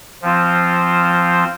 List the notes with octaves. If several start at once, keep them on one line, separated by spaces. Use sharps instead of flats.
F3 C4 F4 C5